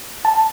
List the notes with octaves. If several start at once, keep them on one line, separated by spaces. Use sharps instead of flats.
A5